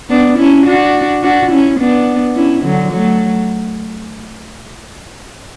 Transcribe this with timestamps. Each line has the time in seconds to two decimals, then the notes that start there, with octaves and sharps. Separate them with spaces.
0.09 B3 D4
0.38 C#4 E4
0.66 D4 F#4
1.23 D4 F#4
1.51 C#4 E4
1.80 B3 D4
2.36 C#4 E4
2.64 D3 F#3
2.92 F#3 A3